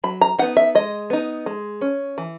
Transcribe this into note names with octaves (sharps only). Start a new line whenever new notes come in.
F#3 B5
A#5
B3 D#4 F#5
E5
G#3 D#5
B3 D#4
G#3
C#4
E3